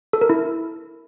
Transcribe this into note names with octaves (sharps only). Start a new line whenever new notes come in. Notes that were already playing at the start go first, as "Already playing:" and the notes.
A4
A#4
E4